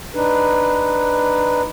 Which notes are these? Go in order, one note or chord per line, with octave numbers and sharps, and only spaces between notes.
D4 D#4 B4